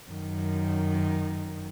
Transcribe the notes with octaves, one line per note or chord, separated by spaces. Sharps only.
F#2 D#3